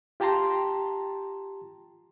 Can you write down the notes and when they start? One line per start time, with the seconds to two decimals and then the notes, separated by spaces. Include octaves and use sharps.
0.20 F4 G4 G5 A5 A#5 C6